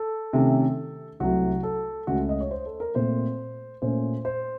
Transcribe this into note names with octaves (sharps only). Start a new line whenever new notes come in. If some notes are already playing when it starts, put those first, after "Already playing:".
Already playing: A4
C3 D#3 A3 C#4
C2 C3 F#3 A3 F#4
A4
C#2 C#3 A3 C#4 F#4
D#5
C#5
C5
A4
A#4
A#2 A3 C4 C5
A#2 A3 C#4 C5
C5